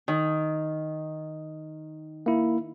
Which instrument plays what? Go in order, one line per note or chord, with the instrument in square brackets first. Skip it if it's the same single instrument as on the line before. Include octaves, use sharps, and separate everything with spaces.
[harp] D#3
[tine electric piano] A#3 E4